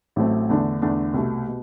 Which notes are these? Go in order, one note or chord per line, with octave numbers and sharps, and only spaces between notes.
A1 A2 F#3 A3 C4
E2 D3 A3 D4
E2 D3 A3 D4
C2 B2 A3
B2